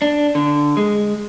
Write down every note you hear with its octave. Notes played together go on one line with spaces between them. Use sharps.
D4
D3
G#3